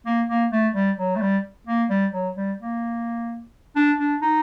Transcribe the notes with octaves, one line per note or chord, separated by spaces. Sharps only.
A#3
A#3
A3
G3
F#3
A3
G3
A#3
G3
F#3
G3
A#3
D4
D4
D#4